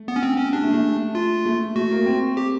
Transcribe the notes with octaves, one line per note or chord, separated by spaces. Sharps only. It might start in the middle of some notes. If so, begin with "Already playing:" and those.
Already playing: A3
B3
C#4
C4
C#4
G3 D4
A3
A3
F4
A3
A3 F#4
A#3
C4
G4